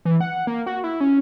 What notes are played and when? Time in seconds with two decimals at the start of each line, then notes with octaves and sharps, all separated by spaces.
0.05 E3
0.21 F#5
0.47 A#3
0.66 F#4
0.84 E4
1.00 C#4